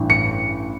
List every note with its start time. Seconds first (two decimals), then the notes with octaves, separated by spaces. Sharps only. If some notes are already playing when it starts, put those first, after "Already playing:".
Already playing: A1 G2 E3
0.10 C#7